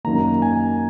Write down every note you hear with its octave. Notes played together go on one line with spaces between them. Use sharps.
F#2 D#3 A#3 A#5
G#5